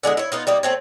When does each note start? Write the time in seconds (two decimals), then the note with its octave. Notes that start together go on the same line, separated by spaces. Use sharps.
0.03 D3 G#3 E4 G#4
0.17 E4 C#5
0.32 B3 D#4 F4
0.47 G3 A#3 D#4
0.63 A3 C4 C#5